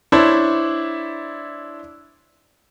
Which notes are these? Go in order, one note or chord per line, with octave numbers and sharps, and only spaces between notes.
D4 E4 C5 C#5